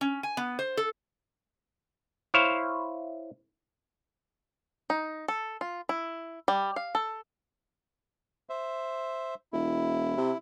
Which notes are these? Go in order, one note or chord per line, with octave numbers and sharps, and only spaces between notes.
C#4
G#5
B3
C5
A4
E4 C5 C#5 F5
D#4
A4
F4
E4
G3
F5
A4
C5 E5
E1 E4
C3